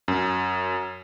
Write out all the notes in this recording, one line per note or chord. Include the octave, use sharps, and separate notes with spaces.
F#2